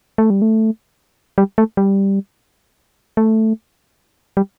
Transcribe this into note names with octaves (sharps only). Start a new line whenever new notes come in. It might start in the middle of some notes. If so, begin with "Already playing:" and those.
A3
G3
A3
G3
A3
G3
A3
G3